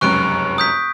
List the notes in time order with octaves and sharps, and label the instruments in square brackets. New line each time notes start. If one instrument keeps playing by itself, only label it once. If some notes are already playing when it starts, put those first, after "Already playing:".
[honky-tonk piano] F1 C#2 F#2 [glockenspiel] C#6 F#6 D7
[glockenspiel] D#6 G6 B6